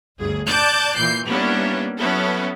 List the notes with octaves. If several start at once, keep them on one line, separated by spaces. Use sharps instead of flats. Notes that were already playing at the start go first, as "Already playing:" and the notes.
G1 D2 G#4
D5 A5 D6 F#6 G6 A6
A#2 E3 G6 C7
G3 A#3 B3 C#4 D4 E4
F#3 B3 C#4 E4 A4